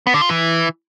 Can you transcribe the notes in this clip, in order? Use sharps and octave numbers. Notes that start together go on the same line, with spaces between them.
B3
D3
F4
E3